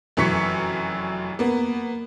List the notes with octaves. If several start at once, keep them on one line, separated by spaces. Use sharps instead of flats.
F1 F#2 E3 C#6 B6 C#7
A#3 B3